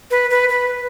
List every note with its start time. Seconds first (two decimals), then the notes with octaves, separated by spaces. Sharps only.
0.11 B4
0.30 B4
0.49 B4